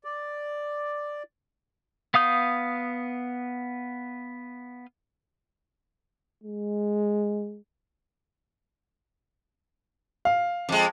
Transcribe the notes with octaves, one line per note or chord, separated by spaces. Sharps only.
D5
B3 F5 D#6 G6
G#3
F5
F2 G#3